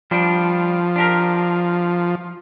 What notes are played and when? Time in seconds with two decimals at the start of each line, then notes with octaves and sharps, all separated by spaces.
0.11 F3 G3 D4
0.96 D4 G4 A#4